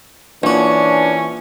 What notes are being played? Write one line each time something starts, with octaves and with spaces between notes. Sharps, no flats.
A#1 E3 C#4 D4 F#4